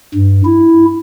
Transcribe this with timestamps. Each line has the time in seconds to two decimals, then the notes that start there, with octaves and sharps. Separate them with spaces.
0.15 G2
0.45 E4